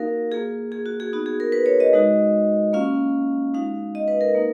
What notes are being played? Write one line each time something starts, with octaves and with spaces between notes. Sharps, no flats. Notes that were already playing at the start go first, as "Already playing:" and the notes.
Already playing: A#3 D#4 F#4 A#4 F5
A#3 F4 G#4
G#4
F#4
G#4
B3 D#4 F#4
G#4
A#4
B4
C#5
D#5
G#3 D#4 F#4
A#3 C#4 F4 F5
G#3 D#4 F#4 F5
D#5
B4
A#4
A#3 D#4